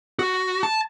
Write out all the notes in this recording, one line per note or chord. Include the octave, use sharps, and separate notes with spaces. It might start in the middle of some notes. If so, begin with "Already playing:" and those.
F#4
A5